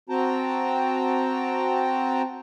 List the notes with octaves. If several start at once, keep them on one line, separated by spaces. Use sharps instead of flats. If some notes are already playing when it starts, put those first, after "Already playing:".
C4 F#4 G5 A5 A#5